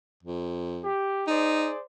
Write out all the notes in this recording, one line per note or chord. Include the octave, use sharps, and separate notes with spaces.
F2
G4
D#4 G#4 C5 D5